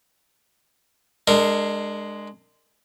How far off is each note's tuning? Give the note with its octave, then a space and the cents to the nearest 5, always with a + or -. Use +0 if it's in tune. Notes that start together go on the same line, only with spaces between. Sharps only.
G#3 +0 D4 +25 A#4 -25